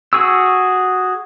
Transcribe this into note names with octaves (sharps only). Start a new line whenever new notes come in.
F#4 G#4 C#6 E6